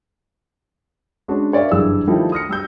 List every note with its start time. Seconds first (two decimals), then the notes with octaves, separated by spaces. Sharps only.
1.28 G#3 C#4 D4 F#4
1.52 A#4 C#5 D5 E5 F5
1.71 F#1 G2 E3 G3 G#4 E6
2.07 D#3 F3 G3 A3 D#4 E4
2.32 D#6 F6 A#6 C#7
2.49 G3 E6 G6